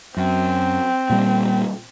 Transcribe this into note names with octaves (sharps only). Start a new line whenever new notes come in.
F#2 C4
A#2 G3